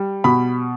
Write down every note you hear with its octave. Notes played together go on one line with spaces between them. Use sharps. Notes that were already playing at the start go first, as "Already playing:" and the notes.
Already playing: G3
B2 B5